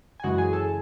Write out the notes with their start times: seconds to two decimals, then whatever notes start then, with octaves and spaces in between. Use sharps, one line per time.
0.20 G#5
0.23 F#2 C#3 E3 G#3 F#4 F#5
0.38 G#4 G#5
0.53 A4 A5